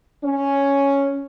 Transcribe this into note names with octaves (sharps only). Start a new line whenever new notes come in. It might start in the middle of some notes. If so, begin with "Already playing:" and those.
C#4